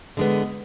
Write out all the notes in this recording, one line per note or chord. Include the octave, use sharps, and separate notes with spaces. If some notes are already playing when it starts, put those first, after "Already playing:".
D3 G#3 B3